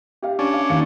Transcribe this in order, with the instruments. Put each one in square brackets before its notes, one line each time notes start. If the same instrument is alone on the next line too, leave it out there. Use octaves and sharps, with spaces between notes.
[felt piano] G4 F5
[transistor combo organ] C#4 D4
[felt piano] F5
D#2 F5 C#7